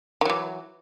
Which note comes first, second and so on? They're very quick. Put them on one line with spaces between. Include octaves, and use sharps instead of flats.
D#3 F#3 E3